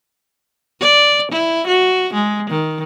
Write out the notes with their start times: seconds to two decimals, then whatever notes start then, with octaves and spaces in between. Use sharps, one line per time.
0.80 D5
1.31 E4
1.67 F#4
2.14 G#3
2.50 D#3